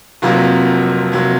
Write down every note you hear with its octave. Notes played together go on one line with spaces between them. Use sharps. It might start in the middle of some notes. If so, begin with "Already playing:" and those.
F1 F2 C3 F#3 A#3 F4
F2 C3 F#3 A#3